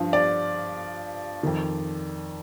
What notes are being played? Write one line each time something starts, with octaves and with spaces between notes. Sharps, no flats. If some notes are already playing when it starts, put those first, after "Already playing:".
Already playing: G2 F3
D5
F2 D#3